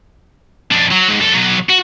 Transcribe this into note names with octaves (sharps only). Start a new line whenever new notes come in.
F2 D4
F#3
G#2
F#2 A4
B1 F#3
F#4